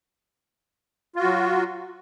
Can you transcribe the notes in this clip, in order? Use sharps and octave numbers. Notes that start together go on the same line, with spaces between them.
F#3 F4 F#4